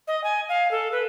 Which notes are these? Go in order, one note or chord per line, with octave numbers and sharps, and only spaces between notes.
D#5
G#5
F5
A4
B4